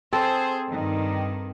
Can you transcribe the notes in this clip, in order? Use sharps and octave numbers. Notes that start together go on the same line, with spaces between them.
C4 G#4 A4 C5
G2 D#3